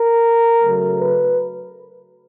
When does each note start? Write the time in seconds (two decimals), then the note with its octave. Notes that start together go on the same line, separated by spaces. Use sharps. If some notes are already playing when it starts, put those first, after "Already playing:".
Already playing: A#4
0.60 C#3 F#3 A3
1.00 B4